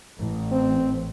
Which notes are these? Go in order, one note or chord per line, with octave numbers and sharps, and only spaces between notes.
A1
C4